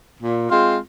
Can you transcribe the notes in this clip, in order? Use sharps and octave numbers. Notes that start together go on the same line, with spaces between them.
A#2
G#3 C4 F4